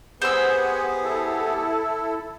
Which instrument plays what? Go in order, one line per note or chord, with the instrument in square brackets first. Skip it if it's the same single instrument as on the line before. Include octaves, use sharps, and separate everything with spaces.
[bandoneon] B3 G4 G#4 [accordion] B4 F#5 G#5 [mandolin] C5 E6
[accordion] E4 A4